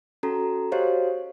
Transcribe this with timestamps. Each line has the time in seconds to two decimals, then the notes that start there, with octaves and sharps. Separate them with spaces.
0.23 C#4 F#4 A4 A#5
0.72 F#4 G4 C5 C#5 D#5 F5